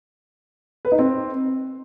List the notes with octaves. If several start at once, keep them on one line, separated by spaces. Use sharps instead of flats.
B4
D#4
C4